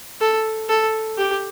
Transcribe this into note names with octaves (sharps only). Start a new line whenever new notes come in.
A4
A4
G4